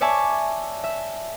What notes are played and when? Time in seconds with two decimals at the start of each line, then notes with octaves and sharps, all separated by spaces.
0.01 C#5 D5 E5 G#5 A5
0.84 E5